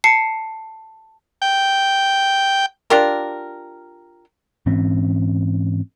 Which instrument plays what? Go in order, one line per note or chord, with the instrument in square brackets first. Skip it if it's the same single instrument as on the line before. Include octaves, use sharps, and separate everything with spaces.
[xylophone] A5 C7 C#7
[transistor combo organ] G5
[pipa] D4 F4 G4 A#4
[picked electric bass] G#2 E3 C4 C#4